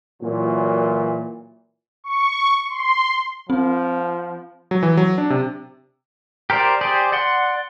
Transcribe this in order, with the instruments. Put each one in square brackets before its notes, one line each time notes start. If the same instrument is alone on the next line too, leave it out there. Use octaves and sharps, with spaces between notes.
[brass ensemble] A#2 E3 F#3
[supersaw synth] C#6
C6
[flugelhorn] F3 [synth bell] C4
[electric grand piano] F#3
E3
F#3
D4
C3
[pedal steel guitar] G4 A#4 C5 D5
G4 G#4 C5 D5
D5 F#5 C6